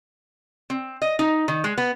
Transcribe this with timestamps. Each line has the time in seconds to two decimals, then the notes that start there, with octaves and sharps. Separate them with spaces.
0.70 C4
1.02 D#5
1.19 D#4
1.48 D#3
1.64 G#3
1.78 B3